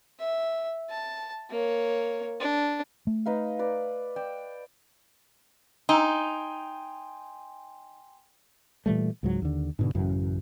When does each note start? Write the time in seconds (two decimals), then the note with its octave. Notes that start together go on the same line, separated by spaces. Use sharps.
0.19 E5
0.90 A5
1.50 A#3 C#5
2.40 D4
3.07 A3
3.26 D#4 B4 F5
3.59 B4 D5
4.16 D5 G5 E6
5.89 D#4 G5 G#5 C6
8.86 A#2 E3 G3 A3
9.23 C#2 G#2 F#3
9.42 D#2 D3
9.79 G#2 B2 D3
9.94 A1 F#2 C#3 E3